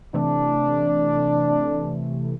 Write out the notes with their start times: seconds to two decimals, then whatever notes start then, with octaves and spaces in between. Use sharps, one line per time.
0.14 C3 E3 A3 D4